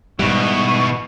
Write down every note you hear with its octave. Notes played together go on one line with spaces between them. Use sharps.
G#2 B2 D#3 G3 E4 C#6